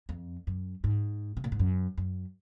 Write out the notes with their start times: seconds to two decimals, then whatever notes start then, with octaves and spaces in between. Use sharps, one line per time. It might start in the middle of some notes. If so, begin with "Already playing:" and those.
0.09 F2
0.47 F#2
0.84 G#2
1.37 C3
1.44 A#2
1.52 G#2
1.59 F#2
1.98 F#2